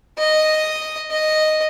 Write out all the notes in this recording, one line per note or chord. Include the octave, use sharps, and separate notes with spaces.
D#5
D#5